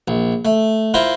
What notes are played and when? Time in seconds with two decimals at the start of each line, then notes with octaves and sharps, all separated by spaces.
0.08 A#1
0.45 A3
0.94 E4 F4 A#4 C5